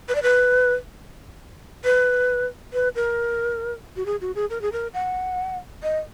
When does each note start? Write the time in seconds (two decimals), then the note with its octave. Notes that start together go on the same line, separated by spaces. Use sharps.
0.08 B4
0.15 D5
0.22 B4
1.84 B4
2.73 B4
2.95 A#4
3.96 F#4
4.06 G#4
4.21 F#4
4.35 G#4
4.50 A#4
4.62 G#4
4.72 A#4
4.94 F#5
5.83 D#5